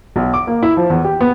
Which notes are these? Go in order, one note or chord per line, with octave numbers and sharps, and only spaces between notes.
B1
D6
A#3
E4
F3
E2
G4
B3